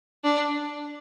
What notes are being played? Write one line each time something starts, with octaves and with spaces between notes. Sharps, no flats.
D4